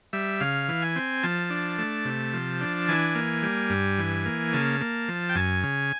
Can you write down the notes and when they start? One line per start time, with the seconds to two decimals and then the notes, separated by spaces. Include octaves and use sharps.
0.13 G3 E5
0.40 C#3 F5
0.68 E3
0.82 G#5
0.96 C4
1.23 F3 A5
1.50 D4
1.78 A3
2.05 C3
2.34 F3
2.61 D4
2.89 E3 G#5
3.15 A#3
3.43 G3
3.70 G2
3.98 E3
4.25 A#3
4.53 C#3 A5
4.81 A#3
5.08 F3
5.29 G5
5.35 F#2 G#5
5.63 C#3